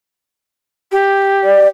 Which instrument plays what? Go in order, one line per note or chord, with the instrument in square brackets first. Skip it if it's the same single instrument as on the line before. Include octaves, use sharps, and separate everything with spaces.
[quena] G4
[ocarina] D5